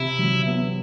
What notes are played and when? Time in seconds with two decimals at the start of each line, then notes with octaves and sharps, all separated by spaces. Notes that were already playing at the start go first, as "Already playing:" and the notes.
Already playing: C3 E4
0.19 F#3
0.47 B3